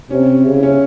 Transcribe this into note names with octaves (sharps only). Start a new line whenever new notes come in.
C3 C#4
C#3
E4
C#4